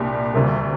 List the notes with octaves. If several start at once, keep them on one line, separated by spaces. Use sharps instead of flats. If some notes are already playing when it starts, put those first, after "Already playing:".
Already playing: C2 A#2 G3 D4
D2 C3 G3 A#3